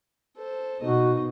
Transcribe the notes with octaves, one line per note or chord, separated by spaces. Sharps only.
A4 C5
B2 D#4 F#4 D#5